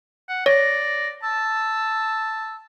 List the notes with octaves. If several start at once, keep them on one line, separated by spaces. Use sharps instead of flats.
F#5
C#5 D5 A#6
A5 E6